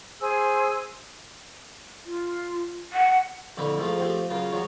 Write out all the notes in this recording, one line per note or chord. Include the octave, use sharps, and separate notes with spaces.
G#4 C5 G#5 E6
F4
F#5
F2 D3 A3 E4 B4
F2 G#2 A3 F4
F3 A3 C4 G4
F#2 C#3 F4
F3 F#3 G#3 C#5